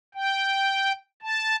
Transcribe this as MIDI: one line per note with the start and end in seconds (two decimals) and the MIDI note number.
0.14 0.92 79
1.22 1.56 81